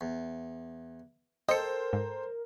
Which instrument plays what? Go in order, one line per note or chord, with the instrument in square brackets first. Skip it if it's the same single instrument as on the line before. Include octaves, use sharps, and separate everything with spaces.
[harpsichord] E2
[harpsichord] A4 G5 [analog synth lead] A#4 [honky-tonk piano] C5 [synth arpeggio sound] D#5 C#7
[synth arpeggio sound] G#2